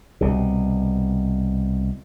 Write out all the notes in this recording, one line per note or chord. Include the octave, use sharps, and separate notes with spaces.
C2 B2